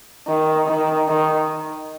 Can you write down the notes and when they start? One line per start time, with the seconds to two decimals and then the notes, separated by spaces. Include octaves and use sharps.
0.28 D#3
0.68 D#3
1.08 D#3